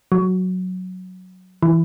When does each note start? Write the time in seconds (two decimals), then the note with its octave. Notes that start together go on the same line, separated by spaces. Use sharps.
0.12 F#3
1.63 E3